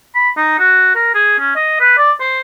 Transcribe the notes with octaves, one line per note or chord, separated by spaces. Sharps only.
B5
D#4
F#4
A#4
G#4
C#4
D#5
B4
D5
C5